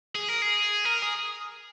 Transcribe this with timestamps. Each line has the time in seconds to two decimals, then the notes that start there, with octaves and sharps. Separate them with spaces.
0.15 G#4
0.29 A#4
0.42 G#4
0.85 A#4
1.03 G#4